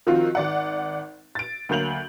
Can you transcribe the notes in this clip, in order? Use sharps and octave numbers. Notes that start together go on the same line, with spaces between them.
D#3 F3 C4 F4 F#4
G#1 D5 F#5
A6 D7
D2 F#3 A#3 G6 F7 F#7